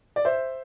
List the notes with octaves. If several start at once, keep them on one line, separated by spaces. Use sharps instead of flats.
D5
C5 E5